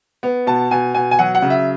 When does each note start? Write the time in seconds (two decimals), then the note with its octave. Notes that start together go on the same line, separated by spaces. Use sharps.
0.23 B3
0.47 B2 A5
0.71 B2 G#5
0.94 B2 G#5
1.11 G#5
1.19 F#3 F#5
1.35 F#5
1.42 C#3
1.50 E5